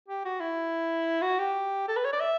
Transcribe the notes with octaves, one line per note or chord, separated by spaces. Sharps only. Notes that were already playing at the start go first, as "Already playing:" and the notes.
G4
F#4
E4
F#4
G4
A4
B4
C#5
D5
E5